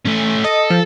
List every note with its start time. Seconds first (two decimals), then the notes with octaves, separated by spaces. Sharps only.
0.05 A3 C#4
0.44 A4 D#5
0.70 F3